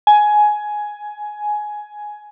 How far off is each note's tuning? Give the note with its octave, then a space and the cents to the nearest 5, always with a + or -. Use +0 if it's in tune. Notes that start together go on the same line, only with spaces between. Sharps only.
G#5 +15